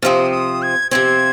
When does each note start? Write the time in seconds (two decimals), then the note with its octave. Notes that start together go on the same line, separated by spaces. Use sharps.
0.02 C3 F3 C4 D#6 F6
0.32 D#6
0.62 G#6
0.91 C3 F3 C4 G#6